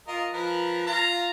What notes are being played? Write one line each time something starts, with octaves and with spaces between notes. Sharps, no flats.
F4 A#4 D#5
F3 A#4 B4
F4 F5 A#5